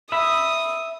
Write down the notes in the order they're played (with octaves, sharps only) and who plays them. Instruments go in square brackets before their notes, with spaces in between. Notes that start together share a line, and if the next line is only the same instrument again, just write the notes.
[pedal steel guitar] E5 B5 [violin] D#6